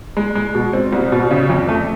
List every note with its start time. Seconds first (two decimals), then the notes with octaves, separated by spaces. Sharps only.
0.17 G#3
0.35 G#3
0.55 B2
0.73 C4
0.93 C2
1.12 B2
1.31 C#3
1.50 F2
1.68 A3